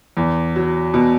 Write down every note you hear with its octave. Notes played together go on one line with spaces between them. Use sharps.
E2
F#3
B2